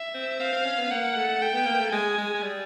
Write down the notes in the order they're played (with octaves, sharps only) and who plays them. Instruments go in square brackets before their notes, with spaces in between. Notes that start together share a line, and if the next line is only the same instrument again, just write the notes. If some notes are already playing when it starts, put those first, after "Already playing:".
Already playing: [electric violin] E5
[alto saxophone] C4
[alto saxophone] C4 [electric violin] F5
[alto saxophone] C4
C#4
B3
[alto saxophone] A#3 [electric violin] F#5
[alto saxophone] A3
[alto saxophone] A3 [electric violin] G5
[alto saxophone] B3
A#3
A3
[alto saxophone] G#3 [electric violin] G#5
[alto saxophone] G#3
G#3
G3